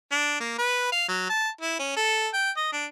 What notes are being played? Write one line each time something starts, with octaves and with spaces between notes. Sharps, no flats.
D4
A#3
B4
F5
F#3
A5
E4
C#4
A4
G5
D#5
D4